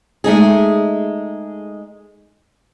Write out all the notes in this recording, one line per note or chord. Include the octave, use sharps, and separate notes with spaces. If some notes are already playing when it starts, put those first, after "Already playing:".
G#3 A3 D#4 G#4